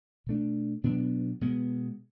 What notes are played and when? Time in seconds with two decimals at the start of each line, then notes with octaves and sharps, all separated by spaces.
0.27 B2 A3 D4
0.84 B2 F#3 B3 D4
1.41 B2 G#3 B3